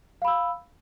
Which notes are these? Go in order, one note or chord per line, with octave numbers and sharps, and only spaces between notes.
F5 B5 E6